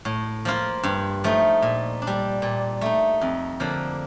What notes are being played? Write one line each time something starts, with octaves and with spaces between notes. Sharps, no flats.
A2
F3 A#3 F4
G2
F3 A3 D#4
A#2
D4
G3
A#2
A3 D#4
F2
D3 F3 A#3 D4